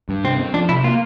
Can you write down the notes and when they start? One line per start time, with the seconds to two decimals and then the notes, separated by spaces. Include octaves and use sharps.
0.09 G2
0.24 C3 C4
0.39 C4
0.54 F3 D4
0.69 C3 E4
0.84 A#3 F4